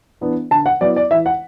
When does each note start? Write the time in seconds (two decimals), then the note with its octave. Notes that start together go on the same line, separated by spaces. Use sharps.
0.21 E3 B3 D4
0.51 D3 A5
0.66 F#5
0.81 F#3 B3 E4 D5
0.96 D5
1.11 E3 E5
1.26 F#5